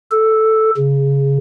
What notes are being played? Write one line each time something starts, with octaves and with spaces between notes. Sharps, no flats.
A4
C#3